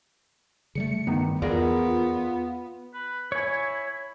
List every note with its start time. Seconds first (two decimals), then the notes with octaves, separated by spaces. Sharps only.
0.75 C#3 G3 A3 C#7
1.07 G2 D#3 B3 D#4
1.42 E2 B3 F4 G#4 A#4 D5
2.94 B4
3.32 E4 C#5 G#5